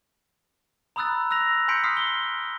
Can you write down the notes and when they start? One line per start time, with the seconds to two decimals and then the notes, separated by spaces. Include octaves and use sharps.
0.96 A#5 B5 D#6 E6 F#6 A6
1.31 E6 F#6 A#6 F7
1.68 G#5 C6 G6 B6 C#7 D7
1.84 G#5 C6 D#6 F6 B6 C7
1.97 G7